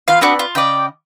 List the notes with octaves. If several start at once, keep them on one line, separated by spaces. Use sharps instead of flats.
E2 B3 F4 F5
B3 C4 D4 F#4 B4 D5
F4
C#3 C#4 D5 D#5 G5